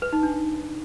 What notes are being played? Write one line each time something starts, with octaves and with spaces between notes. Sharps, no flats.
B4
D#4
D4